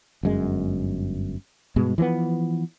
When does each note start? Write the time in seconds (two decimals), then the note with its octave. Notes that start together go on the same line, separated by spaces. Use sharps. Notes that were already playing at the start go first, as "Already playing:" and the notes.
0.23 G1 F#2 G#3
1.76 G2 B2 G#3
1.98 E3 F3 G#3 B3